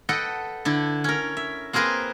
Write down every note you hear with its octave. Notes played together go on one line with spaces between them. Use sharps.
A4 B4 D#5 F#5 G5
D3 D4 E4
C#4 A#4
E5
A#3 C4 G#4 A#4 B4